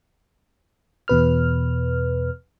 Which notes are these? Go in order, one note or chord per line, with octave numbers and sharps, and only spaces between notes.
E2 B2 B4 F6